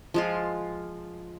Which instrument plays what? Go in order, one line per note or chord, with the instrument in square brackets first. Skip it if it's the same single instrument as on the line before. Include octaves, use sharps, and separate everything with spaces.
[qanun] F3 G#3 F4